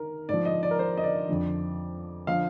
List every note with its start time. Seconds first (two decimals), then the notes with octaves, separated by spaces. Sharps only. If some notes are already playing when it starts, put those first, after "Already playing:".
Already playing: D#3 A#4
0.29 G#2 F3 D5
0.45 D#5
0.63 D5
0.71 A#4
0.79 C5
0.97 D#5
1.04 D5
1.29 F2 D3 F3
2.27 D3 F3 F5